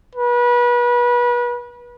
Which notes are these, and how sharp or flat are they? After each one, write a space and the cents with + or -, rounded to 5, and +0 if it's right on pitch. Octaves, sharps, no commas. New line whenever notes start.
B4 -30